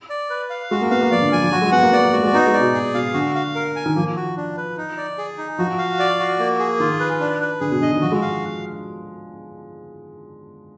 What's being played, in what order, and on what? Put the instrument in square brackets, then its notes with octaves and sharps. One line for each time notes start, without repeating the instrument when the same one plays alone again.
[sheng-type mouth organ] D5
B4
F5
[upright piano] G#3 [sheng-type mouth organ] F#4
[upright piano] A#3
[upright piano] B3 [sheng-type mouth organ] F5
[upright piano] A#3
[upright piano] F3 [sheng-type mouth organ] D5
[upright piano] D3
[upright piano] F3 [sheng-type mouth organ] G#5
[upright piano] F3
[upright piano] F#3 [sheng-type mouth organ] F#4
[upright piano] G#3
[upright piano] B3 [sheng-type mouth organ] F#5
[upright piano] A#3
[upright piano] B3 [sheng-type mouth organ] D5
[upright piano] A#3
[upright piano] G#3 [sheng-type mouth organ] F#4
[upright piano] G#3
[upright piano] B3 [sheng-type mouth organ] D#4
[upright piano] G#3
[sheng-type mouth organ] D5
[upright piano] B2
[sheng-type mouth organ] G#4
[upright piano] B2 [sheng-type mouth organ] F5
[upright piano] D3 [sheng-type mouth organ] F#4
[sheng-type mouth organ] F5
A#4
G#5
[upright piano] D#3
[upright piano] F3 [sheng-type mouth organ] A#3
[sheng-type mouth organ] F#4
D4
B4
D#4
D5
G#4
D#4
[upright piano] F3 [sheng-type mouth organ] F#4
[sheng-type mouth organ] F5
D5
F#4
A#3
G#4
[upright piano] D#3 [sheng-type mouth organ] F4
[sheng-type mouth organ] B4
D4
B4
[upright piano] D3 [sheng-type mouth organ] G#4
[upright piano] B2
[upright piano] D3 [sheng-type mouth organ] D#5
[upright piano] D#3
[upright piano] F3 [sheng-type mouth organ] F#4
[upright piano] G#3
[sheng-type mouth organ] F5